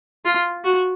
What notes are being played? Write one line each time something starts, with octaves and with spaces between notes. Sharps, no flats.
F4
F#4